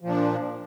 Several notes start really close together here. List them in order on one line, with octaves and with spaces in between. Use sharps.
F3 A#2 D4